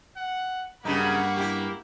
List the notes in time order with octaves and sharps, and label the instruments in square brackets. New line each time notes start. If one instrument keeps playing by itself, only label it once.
[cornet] F#5
[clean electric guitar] G2 [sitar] C#3 F#3 D#4 [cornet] A#3 [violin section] F#5 B5 C#6
[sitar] E4 G4